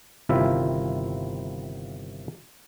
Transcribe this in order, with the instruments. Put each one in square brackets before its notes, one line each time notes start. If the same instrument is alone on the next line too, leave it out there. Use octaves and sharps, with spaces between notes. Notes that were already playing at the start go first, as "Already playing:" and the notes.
[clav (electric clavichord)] G1 C3 D#3 E4 F4 E5